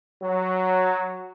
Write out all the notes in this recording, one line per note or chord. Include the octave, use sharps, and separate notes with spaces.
F#3